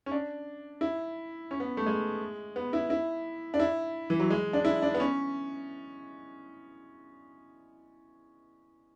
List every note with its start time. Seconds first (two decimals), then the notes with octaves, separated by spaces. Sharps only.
0.06 C#4
0.12 D4
0.81 E4
1.51 C#4
1.60 B3
1.77 A3
1.86 G#3
2.56 B3
2.73 E4
2.90 E4
3.54 D4
3.60 E4
4.10 E3
4.20 F#3
4.30 G#3
4.53 D4
4.65 E4
4.82 D4
4.94 B3
5.00 C#4